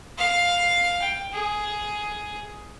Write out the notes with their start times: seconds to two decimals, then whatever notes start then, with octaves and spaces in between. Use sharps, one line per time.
0.18 F5
1.02 G5
1.32 G#4